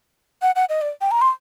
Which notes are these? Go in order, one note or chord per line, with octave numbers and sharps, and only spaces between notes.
F#5
F#5
D#5
D5
G5
A#5
C6